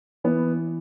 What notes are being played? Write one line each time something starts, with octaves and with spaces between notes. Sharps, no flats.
E3 B3